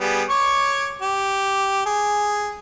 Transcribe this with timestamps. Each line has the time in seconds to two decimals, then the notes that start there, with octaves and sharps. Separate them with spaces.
0.01 G3 B3 G#4
0.30 C#5 C#6 D6
1.02 G4
1.86 G#4